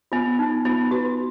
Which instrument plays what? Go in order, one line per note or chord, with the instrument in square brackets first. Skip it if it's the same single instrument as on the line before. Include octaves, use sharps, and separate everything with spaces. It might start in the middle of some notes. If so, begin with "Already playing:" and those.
[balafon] B3 [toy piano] F4
[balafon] B3 [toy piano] D#4
[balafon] B3 [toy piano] F4
[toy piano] F#4 [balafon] B4